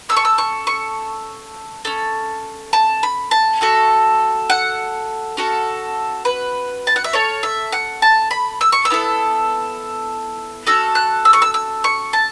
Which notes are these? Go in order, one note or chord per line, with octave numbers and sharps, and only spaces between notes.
C#4 A4 E6
C#6
E6
C#6
C#6
C#4 A4
A5
B5
A5
A3 F#4 A4
F#5
C#4 F#4 A4
B4
A5
F#5
E5
C#4 A4 C#5
E5
F#5
A5
B5
E6
C#6
E6
B3 E4 A4
C#4 F#4 A4 E6
F#6
E6
C#6
E6
E6
C#6
A5